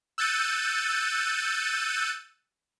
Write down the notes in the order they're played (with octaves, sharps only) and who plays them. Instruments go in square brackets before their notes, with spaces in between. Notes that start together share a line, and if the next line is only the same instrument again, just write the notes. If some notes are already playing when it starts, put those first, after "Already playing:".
[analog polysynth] E6 F#6 G6 A6 C#7 D#7